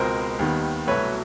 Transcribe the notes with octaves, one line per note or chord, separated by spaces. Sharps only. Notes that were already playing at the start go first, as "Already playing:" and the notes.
Already playing: C#2 B2 G#3 C4 A#4 C5
D#2 D#3 G3 B3
C2 B2 F#3 A3 B4 C#5